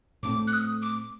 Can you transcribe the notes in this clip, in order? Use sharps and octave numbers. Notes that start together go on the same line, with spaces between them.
A2 A3 C4 D6
F#6
D#6
D6